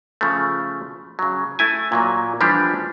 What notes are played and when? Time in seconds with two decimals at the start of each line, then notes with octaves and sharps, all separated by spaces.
0.21 C#3 F3 A3
1.19 C#3 F#3
1.59 A3 E4 G#5
1.92 A#2 F#3 A#3
2.41 E3 F3 G3 A3 D4 G4